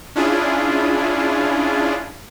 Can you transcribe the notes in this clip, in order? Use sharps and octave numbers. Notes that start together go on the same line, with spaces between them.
C#4 D4 E4 F4 G#4